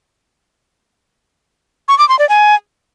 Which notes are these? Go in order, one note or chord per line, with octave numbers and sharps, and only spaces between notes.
C#6
D6
C6
D5
G#5